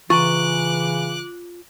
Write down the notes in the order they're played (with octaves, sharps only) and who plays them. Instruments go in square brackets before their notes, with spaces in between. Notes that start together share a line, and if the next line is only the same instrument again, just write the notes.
[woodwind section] C#3 E3 [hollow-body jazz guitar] F4 G#5 A#5 [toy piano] C#6 [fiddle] D6 F#6